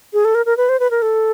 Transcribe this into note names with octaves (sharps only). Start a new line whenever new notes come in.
G#4
A4
A#4
A#4
B4
C5
B4
A#4
A4